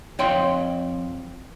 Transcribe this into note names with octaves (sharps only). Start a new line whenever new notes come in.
F2 C#5 G5 C6